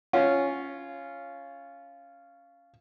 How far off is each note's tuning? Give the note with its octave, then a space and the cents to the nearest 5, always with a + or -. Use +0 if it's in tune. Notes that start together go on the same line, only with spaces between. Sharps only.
C#4 +0 F4 -10